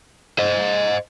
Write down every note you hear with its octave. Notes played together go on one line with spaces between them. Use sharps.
C5 D#5